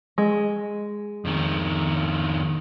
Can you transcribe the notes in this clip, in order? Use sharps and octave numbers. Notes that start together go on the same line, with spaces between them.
G#3
F2 D#3